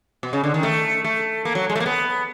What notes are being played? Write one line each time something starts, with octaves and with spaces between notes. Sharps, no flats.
B2
C#3
D3
D#3
A3
A3
A#3
F#3
G#3
A3
A#3
B3